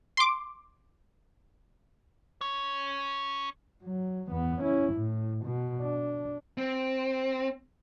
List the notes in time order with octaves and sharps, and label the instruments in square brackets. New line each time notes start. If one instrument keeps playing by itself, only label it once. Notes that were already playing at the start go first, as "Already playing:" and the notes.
[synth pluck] C6 D6
[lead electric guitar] C#4 C#5
[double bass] F#3
E2 B3
C#4 E4
A2
B2
D4
[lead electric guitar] C4